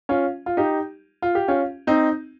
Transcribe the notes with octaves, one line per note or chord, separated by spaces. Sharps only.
C#4 F4
F4
D#4 G4
F4
G4
C#4 F4
C4 D#4